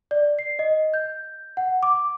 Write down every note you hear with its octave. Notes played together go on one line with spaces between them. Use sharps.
D5
C7
D#5
G6
F#5
D6